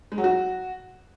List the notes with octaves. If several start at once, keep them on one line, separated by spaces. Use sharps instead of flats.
G#3
F#3
F#4